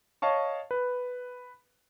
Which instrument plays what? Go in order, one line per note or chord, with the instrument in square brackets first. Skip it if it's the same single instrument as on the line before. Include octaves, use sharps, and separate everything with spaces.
[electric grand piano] C#5 D#5 F5 A5 C#6
B4